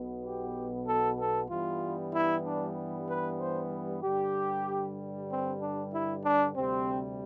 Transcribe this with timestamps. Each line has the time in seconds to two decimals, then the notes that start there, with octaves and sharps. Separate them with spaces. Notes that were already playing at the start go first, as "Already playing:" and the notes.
Already playing: B1 B2 B3
0.24 G4
0.88 A4
1.19 A4
1.50 G2 E3 G3 B3 F4
2.13 E4
2.45 D4
3.08 B4
3.40 C5
4.03 G2 D3 G3 G4
5.30 C4
5.61 D4
5.92 E4
6.24 D4
6.55 D2 C3 G3 C4